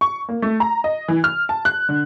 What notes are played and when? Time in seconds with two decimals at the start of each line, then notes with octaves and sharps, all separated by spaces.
0.01 C#6
0.29 A#3
0.42 A3
0.60 A#5
0.84 D#5
1.08 E3
1.24 F6
1.49 A5
1.65 F#6
1.89 D3